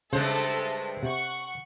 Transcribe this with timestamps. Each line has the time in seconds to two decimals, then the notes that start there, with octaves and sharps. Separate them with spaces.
0.13 G2 C#3 G#3 A4 C5 E5
1.03 C3 F#5 C#6